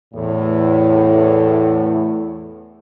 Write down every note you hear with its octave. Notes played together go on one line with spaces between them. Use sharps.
E2 A2